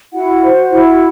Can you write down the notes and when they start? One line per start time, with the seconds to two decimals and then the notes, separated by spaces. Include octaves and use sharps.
0.13 E4 F#4 F#5
0.42 C5
0.72 E4